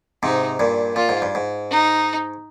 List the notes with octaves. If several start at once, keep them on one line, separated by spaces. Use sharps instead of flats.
G#2 C3 D#4
G2 A#2
A#2 F4
G#2
G2
G#2
D#4